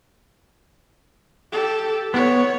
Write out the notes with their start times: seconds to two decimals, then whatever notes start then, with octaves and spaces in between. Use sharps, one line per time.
1.52 G4 A4
2.14 B3 C#5